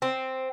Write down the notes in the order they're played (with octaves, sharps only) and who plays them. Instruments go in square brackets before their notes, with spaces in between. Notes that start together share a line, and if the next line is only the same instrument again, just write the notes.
[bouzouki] C4